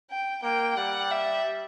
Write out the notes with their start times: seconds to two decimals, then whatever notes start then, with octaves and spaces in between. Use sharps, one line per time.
0.11 G5
0.43 A#3 G5
0.76 G3 F#5
1.11 E5